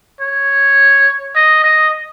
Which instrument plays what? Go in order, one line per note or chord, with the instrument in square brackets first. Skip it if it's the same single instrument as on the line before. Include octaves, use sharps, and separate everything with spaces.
[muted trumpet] C#5
D#5
D#5